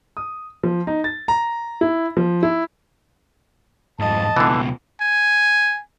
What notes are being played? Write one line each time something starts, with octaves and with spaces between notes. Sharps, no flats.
D#6
F3
D#4
A6
A#5
E4
F3
E4
F2 G#2 D#5 A5
C#2 B2 D3 E3
G#5